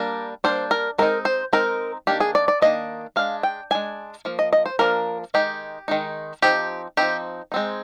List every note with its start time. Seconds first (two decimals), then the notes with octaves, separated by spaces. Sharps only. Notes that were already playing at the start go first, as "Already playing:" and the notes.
Already playing: G3 A#3 D4 A#4
0.44 G3 A#3 D4 C5
0.71 A#4
0.98 G#3 C4 D#4 A#4
1.25 C5
1.53 G#3 C4 D#4 A#4
2.07 D#3 A#3 D4 G4
2.20 G#4
2.35 D5
2.48 D5
2.62 D#3 A#3 D4 D#5
3.16 G#3 D4 F5
3.43 G5
3.71 G#3 D4 G#5
4.25 F3 A#3
4.39 D#5
4.53 D#5
4.66 C5
4.79 F3 A#3 D4 A#4
5.34 D#3 G#3 D#4 G4
5.88 D#3 G#3 D#4
6.42 F3 C4 D#4 G4
6.97 F3 C4 D#4 G4
7.52 G#3 C4 D#4